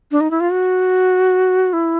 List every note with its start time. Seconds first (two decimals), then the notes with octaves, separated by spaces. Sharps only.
0.11 D4
0.21 D#4
0.31 E4
0.40 F4
0.51 F#4
1.73 E4